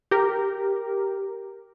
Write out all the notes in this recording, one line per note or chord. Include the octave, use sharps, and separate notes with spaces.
G4 A#4